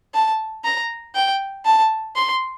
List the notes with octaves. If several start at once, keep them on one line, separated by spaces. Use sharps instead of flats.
A5
A#5
G5
A5
C6